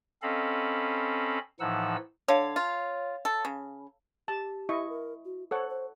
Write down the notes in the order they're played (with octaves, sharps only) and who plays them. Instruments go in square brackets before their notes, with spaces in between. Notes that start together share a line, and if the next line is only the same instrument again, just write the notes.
[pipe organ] C4 C#4 A4 D#5 F5 B5
A2 E3 F3 D#4 F#5 E6
[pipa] D3 [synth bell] C#5 F5
[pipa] F4
A4
C#3
[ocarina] G4 [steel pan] A5
[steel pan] E4 D#5 C#6
[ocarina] A#4
F#4
[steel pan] A4 C#5 F#5 [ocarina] C5
[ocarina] C5